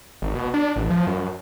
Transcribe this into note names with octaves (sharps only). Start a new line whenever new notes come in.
G#1
B2
D4
A1
F3
F#2